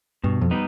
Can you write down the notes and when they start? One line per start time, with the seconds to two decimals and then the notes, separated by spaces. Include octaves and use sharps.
0.24 G2 B2
0.41 F2
0.51 G3 B3 D#4